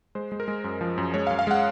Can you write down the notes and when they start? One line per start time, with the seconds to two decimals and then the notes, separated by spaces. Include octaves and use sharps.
0.15 G#3 C5
0.32 G#3
0.40 A#4
0.48 G#3
0.64 F#2
0.81 F3
0.98 F#2
1.14 G#3 C#5
1.27 F5
1.31 F#2
1.39 F5
1.47 G#3 F#5